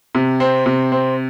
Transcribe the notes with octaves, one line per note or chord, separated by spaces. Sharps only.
C3
C4
C3
C4